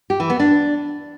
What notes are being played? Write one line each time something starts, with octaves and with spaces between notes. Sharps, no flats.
G4
E3
B3
D4